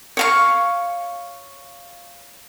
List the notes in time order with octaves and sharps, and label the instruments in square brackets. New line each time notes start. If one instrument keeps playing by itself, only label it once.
[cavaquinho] C#5 F5 C#6